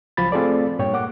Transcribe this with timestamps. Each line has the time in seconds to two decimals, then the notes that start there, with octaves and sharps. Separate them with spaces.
0.17 C#2 F3 F#3 B5 A6
0.32 A3 C4 F4 G#4 A4 D5
0.79 G2 A#2 C#5 G5
0.93 A#3 F#5 D6